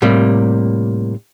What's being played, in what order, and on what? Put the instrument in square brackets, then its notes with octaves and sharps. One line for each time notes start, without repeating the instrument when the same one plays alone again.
[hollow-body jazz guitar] A2 C3 G3 A#3